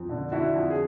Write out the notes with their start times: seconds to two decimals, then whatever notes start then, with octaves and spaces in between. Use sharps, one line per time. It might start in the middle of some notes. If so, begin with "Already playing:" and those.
Already playing: F2
0.09 D3
0.32 D3 E4 F#4
0.55 F2
0.70 G#4